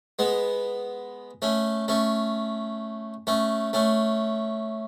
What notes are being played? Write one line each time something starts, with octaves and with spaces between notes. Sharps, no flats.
G#3 B3
A3 C#4
A3 C#4
A3 C#4
A3 C#4